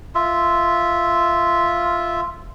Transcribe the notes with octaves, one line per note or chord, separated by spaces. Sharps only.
F4 E5